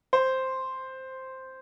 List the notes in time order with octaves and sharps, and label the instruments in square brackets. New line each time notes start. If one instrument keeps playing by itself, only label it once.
[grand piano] C5